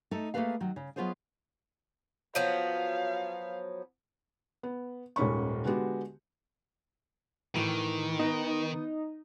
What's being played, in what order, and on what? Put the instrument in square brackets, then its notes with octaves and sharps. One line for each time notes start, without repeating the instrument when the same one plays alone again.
[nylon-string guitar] A3 D#4 A4
A3 A#3 G#4 A4 B4 F5
D#3 F#3
C#3
F#3 B3 F4 G#4 C5 D#5
[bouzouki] F3 F#3 B3 [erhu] F5
[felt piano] B3
D#1 G#2 D#3 C#4 B5 C#6
D3 G#3 B3 F#4 G4
[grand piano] A2 E3 F7 [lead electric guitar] D#3
[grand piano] B3 [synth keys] D#4